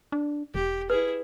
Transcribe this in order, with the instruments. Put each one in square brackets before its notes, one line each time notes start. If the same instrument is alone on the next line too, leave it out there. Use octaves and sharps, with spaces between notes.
[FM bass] D4
[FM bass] E1 [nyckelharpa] G4
[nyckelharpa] E4 G#4 [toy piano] B4